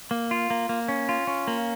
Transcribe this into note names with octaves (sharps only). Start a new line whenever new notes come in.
A#3
F4
A#3
A#3
C#4
F4
C#4
A#3